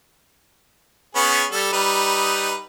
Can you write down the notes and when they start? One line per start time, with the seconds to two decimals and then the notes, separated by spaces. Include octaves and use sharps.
1.15 B3 C#4 G#4
1.52 G3 A4
1.72 G3 D#4 B4